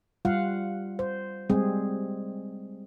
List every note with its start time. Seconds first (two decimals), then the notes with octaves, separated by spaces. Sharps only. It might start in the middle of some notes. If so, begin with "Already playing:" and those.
0.25 G3 F4 F5 F#5
0.99 C5
1.50 G3 G#3 C4 G#4